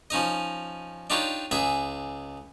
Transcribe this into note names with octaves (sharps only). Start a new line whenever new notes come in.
F3 C#4 D#4 D#5
D4 D#4 F4 G4 C#5
C#2 G#4 E5